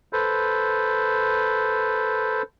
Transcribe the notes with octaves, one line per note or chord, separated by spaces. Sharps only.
A4 B4 C5